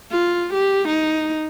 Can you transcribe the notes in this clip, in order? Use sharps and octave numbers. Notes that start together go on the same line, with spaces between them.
F4
G4
D#4